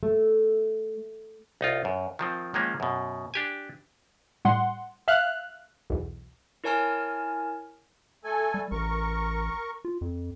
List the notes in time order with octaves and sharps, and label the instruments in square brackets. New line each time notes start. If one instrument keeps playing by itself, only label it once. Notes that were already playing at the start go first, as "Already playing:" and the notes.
[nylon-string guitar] A3
[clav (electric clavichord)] C2 D#4 F4
F#2
D#3 F3 C4
D#3 F3 G#3 A#3 C#4
F#2 B2
D4 G4 G#5
[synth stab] A2 G3 F#5 C6
E5 F5 F6 F#6
B1 E2
[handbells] E4 A#4 C#5 G#5 A5 F6
[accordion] A3 A4 G#5
[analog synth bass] G3
[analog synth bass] A1 [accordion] A#4 C#6
[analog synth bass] F4
F2